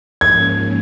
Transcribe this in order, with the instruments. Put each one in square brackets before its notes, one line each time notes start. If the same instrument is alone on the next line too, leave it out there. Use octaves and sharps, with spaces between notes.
[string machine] G#2 F3 A#3 C#4 [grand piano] G#6